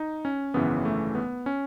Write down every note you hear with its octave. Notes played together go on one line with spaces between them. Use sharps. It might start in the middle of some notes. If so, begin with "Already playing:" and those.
Already playing: D#4
C#4
G#1 F#2 C#3 E3 B3
A3
B3
C#4